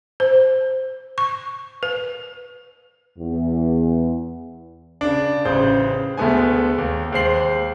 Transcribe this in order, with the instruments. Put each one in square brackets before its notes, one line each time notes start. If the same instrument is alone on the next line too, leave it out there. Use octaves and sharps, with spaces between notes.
[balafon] C5
C#6
B4
[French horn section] E2
[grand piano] C#3 D4
A1 C#3 C5 G6
D2 G#3 A3 B3 G#5
D#2
D#2 G#3 C5 C7 F#7